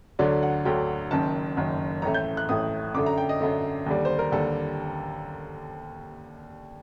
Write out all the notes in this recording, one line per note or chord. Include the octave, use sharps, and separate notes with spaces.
D2 D3 F#3 D5
F#5
D2 D3 F#3 G5
F#1 F#2 D#3 A5
F#1 F#2 D#3
A1 A2 A3 A#5
G6
F#6
A1 A2 A3 D#6
F#2 D3 A3 D6
A#5
G5
D#5
F#2 D3 A3
D#2 D3 G3 D5
C5
A#4
D#2 D3 G3 A4